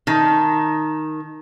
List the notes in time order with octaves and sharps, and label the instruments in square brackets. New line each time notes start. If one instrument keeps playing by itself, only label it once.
[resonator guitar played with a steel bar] D#3 [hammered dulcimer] A5